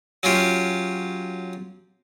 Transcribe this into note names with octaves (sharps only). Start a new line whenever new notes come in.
F#3 C#4 F4 G4